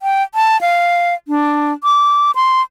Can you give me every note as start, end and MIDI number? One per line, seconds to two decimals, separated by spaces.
0.02 0.23 79
0.35 0.60 81
0.61 1.14 77
1.28 1.72 62
1.84 2.31 86
2.35 2.62 84